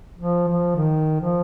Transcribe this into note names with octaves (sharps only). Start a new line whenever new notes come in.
F3
F3
D#3
F3